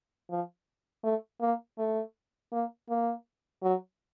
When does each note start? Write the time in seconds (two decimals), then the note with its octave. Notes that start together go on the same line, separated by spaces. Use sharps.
0.30 F3
1.04 A3
1.41 A#3
1.78 A3
2.52 A#3
2.90 A#3
3.63 F#3